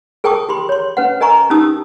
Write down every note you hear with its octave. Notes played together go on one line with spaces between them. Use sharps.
G#4 A#4 G5 A5 C#6 D#6
G4 B5 C6
C#5 C6
C#4 B4 F#5
A#4 D#5 G#5 A#5 C#6
C#4 D#4 G4 A5 D#6 E6